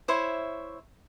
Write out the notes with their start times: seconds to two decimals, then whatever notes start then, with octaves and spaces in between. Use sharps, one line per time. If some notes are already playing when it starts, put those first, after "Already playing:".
0.08 E4 C5 C#5 E5